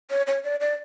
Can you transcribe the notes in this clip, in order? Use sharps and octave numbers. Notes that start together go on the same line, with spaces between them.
C#5
C#5
D5
D5